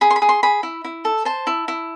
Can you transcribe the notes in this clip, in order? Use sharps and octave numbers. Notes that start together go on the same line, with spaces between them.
G#4 B5
C6
B5
G#4
C6
G#4 B5
E4
E4
A4
C5 A5
E4
E4